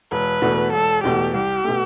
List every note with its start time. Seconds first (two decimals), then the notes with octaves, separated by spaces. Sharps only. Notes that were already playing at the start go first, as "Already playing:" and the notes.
0.12 E1 B4
0.42 E2 B2 A3
0.72 E1 A4
1.03 E2 B2 A3 G4
1.33 C2 G4
1.64 B2 A3